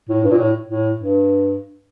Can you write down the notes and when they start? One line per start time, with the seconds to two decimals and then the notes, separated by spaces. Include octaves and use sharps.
0.09 A2
0.24 G2
0.31 A#2
0.38 A2
0.68 A2
0.97 G2